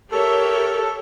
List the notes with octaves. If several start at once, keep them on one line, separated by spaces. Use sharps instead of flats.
G4 A4 A#4 C#5 E5